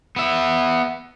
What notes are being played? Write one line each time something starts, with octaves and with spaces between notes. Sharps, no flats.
B3 E5